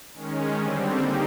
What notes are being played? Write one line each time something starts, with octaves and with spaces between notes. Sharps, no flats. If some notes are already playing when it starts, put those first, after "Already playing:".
D#3 G#3 C#4
D3 G3 C4
A#3 D#4 G4